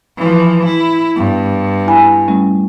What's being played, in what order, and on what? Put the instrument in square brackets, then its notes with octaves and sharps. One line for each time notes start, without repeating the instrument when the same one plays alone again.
[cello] E3 F3
E4
[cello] G2 [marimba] B3
[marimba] E4 G#5 B5
G3 A3 C#4